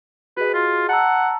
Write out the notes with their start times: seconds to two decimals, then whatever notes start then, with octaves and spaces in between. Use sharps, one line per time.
0.37 F#4 G#4 B4 D#5
0.54 F4
0.89 F#5 A5 A#5 E6